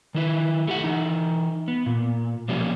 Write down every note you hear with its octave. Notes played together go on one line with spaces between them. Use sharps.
D#3 E4 B4
A3 G4 F#5
E3 D#4
B3
A#2
B2 F3 G3 A#3 C#4